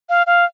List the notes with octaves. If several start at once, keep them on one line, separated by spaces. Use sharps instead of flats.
F5
F5